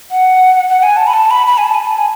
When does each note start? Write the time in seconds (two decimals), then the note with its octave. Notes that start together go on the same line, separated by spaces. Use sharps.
0.11 F#5
0.69 F#5
0.83 G#5
0.97 A5
1.07 B5
1.13 A5
1.31 B5
1.47 B5
1.58 G#5
1.64 A5
1.74 G#5
1.81 A5
1.98 G#5